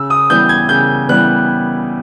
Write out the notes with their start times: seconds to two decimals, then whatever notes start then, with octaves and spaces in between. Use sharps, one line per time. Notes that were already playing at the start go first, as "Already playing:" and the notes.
Already playing: C#3 E6
0.10 D#6
0.30 E3 G3 B3 G6
0.49 G#6
0.69 C#3 G6
1.09 E3 G3 B3 F#6